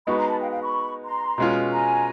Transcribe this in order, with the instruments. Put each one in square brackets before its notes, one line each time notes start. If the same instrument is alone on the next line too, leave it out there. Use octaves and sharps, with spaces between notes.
[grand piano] G#3 B3 D#4 F#4 [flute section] B5 C#6
[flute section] A#5 C6
A5 B5
F5 G5
F5 G5
B5 C#6
A#5 C6
[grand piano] B2 G#3 C#4 F4
[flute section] G#5 A#5